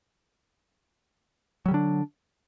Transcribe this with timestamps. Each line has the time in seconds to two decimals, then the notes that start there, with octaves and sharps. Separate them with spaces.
1.66 F#3
1.68 G3
1.71 D3
1.74 D4